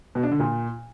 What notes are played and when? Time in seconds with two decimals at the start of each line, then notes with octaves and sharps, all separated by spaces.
0.15 B2
0.23 D4
0.31 D3
0.39 A#2